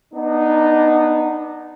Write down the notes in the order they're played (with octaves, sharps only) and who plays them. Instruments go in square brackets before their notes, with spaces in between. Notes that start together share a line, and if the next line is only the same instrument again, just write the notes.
[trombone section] B3 D4 D#4